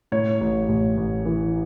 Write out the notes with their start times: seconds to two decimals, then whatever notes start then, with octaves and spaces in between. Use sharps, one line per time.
0.12 A2 C#5
0.41 A1
0.68 A1
0.97 A1
1.25 E3